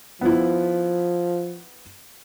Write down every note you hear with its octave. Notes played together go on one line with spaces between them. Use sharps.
F3 B3 E4